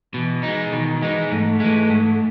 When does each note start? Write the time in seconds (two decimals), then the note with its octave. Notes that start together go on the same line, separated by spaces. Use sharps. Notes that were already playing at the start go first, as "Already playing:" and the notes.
0.14 B2 E3
0.43 G#3 D#4
0.72 B2 D#3
1.02 E3 G#3 D#4
1.32 G#2 A3
1.60 E3 G#3
1.90 G#2